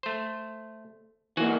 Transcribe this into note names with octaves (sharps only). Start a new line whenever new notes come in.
A3 C5
E3 A#3 F#4 F#5 G#5